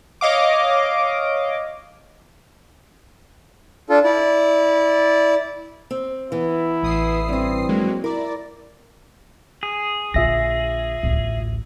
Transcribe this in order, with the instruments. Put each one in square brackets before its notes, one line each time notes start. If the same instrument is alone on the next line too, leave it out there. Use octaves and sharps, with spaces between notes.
[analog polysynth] C#5 D#5 F5 D6
[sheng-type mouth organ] D4 F4 A4
E4 D5
[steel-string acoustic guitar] C4
[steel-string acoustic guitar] E3 B3 [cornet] E4
[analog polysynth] A1 D#6 C7
[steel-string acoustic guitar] G2 E3 [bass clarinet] C4
[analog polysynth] F#3 G#3 A#3
[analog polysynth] E4 D5 [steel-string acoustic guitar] A#4
[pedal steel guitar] G#4
[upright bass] A#1 D3 [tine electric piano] F4 E5 A#6
[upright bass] A1 D2